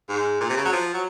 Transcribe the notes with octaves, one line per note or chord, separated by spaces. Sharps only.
G#2
A#2
C3
C#3
F#3
F3
F#3